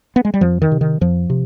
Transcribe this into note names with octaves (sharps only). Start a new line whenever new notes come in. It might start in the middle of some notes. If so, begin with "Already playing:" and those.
B3
G#3
G3
F2 F3
D#3
C3
D#3
F2 F3
C3